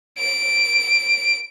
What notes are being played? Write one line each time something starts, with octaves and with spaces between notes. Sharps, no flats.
D7